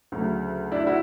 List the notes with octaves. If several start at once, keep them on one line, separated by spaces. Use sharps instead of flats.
D2 C#3 F#3
D4 E4
E4 F#4